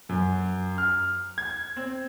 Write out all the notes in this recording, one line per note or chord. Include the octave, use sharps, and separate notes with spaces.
F#2
F6
G#6
C4